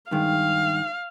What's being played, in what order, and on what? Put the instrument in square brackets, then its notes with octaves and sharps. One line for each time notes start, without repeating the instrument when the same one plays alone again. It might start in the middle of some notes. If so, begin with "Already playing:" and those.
[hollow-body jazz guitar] G2 D#3 G#3 [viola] F5